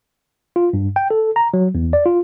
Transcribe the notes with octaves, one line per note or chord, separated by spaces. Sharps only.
F4
G2
G5
A4
A#5
F#3
E2
D5
F4